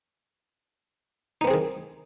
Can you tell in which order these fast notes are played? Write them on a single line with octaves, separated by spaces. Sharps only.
D#4 B3 C4 G#4 D#3